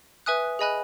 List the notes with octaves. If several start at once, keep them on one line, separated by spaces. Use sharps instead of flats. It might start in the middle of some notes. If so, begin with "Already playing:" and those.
B4 E5 G#5 D#6 F#6
G#4 D#5 G#5 B5 F#6